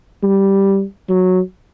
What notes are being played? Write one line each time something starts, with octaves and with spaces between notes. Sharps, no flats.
G3
F#3